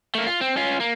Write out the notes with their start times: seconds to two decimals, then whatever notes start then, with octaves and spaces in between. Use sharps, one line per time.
0.15 A3 A#3
0.27 F4
0.41 C4
0.57 C#4 F4
0.80 A#3